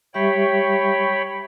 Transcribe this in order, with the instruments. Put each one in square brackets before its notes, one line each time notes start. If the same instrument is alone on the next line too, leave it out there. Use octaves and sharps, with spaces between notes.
[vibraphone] G3 G4 E5 [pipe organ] C#5 G5 B5